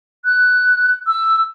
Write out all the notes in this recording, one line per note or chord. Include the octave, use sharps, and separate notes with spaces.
F#6
E6